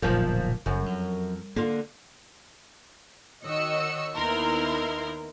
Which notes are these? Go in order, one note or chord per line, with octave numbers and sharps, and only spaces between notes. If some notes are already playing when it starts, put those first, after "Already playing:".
D1 B1 F#2 A#2 F3
F#1 F#2
F2
D3 A#3 F4
D#3 F#4 C#5 D#5 E6 C#7
D#2 B3 D#4 E4 A#4 C6